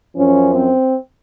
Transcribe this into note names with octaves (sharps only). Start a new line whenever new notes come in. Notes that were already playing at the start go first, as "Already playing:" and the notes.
F#2 F3 C#4
C4